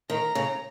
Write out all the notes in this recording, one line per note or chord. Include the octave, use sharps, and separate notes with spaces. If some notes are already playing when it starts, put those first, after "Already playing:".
D#3 A#5
C#3